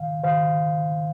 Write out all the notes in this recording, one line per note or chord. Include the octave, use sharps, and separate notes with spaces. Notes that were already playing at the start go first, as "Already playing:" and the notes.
Already playing: G#2 D#3 F5
G#2 D#3 C5 F5